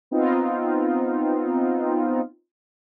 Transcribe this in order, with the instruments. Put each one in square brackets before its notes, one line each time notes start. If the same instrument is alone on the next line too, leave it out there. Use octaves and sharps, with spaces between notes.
[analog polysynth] B3 C4 D#4 F4